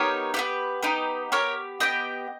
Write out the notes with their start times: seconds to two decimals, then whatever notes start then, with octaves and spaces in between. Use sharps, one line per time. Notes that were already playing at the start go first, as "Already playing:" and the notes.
Already playing: B3 D#4 G4 A#4 C#5
0.34 B3 D#4 G4 B4
0.83 B3 D#4 G4
1.32 B3 G4 A#4 C#5
1.80 B3 G4 D#5 G5